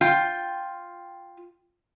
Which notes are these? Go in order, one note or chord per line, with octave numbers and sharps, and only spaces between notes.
F4 G5